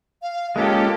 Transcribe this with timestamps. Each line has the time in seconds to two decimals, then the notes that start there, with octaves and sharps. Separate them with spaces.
0.22 F5
0.56 G#3 A#3 C#4 F4 G4 A4